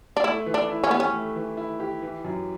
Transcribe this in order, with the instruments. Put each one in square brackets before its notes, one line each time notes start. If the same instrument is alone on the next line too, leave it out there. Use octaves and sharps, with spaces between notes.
[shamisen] D4
[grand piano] A3 [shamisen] E4
[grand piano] E3
[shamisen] D4
[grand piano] E4
[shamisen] C#4
[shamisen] B3 [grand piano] G4
[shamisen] C#4
[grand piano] A3
E3
E4
G4
E3
F#2